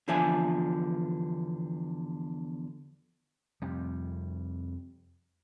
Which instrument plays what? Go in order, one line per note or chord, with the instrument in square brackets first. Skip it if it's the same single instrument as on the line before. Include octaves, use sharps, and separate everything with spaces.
[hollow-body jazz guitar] E2 D3 F3 D4 E5 G#5
[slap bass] F2 C3 G3